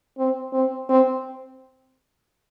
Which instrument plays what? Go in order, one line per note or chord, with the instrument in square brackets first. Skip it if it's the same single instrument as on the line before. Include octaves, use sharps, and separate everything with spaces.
[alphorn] C4
C4
C4